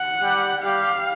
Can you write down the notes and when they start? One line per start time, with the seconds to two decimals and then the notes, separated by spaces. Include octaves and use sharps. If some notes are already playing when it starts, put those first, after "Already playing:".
Already playing: F#5
0.22 G3 G4
0.63 G3 G4 F5